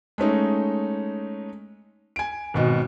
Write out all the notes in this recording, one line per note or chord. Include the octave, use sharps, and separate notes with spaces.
G#3 A3 C#4 D#4
G#5 D7
G#1 B2 D#5